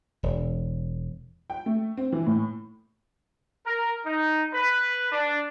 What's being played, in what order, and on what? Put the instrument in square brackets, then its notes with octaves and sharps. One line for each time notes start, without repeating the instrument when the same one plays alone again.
[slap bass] E1
[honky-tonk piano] G5
A3
C4
E3
A2
[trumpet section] A#4
D#4
B4
D4